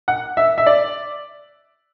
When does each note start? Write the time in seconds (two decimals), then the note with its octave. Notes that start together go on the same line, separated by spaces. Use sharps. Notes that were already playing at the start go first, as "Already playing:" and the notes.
0.08 F#5
0.37 E5
0.58 E5
0.66 D5